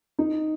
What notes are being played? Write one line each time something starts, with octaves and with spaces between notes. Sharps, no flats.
D#4